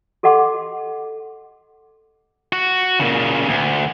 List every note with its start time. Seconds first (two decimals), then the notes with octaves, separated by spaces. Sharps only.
0.23 G4 A4 D#5 F#5 C6 D6
2.53 F#4
3.00 A#2 C#3
3.48 D2